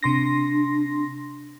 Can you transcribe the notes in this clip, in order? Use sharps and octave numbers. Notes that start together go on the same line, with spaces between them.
C3 D4 C6 A#6